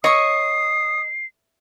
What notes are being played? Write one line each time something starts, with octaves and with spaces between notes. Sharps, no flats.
C#5 D#5 C#6 D#6 C7